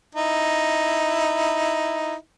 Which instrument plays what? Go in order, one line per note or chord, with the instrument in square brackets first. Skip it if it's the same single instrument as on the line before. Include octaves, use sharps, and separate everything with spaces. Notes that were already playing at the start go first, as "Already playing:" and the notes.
[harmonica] D#4 E4